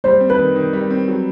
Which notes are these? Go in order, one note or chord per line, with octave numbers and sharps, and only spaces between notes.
G3 C5
C4
B4
D#3
D#3
G3
C4
F#3